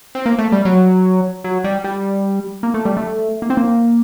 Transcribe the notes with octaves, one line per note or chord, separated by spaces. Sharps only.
C4
A#3
A3
G3
F#3
F#3
G3
G3
A#3
A3
G3
A3
A#3
C4
A#3